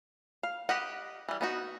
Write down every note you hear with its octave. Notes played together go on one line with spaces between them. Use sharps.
F5
G4 B4 D#5 F#5
E3 G3
B3 D#4 F#4